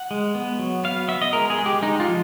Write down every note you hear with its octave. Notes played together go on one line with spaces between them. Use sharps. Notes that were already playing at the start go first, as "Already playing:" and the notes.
Already playing: F#5
G#3
B3
F#3
B3 F5
B3 E5
D#5
G#3 A#4
G#4
G#3
G4
G#3 D#4
F4
F3